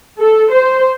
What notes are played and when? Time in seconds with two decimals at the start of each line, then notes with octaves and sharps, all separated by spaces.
0.18 A4
0.52 C5